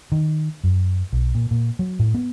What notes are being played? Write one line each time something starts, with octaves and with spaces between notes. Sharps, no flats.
D#3
F#2
B1
A#2
A#2
F#3
A2
B3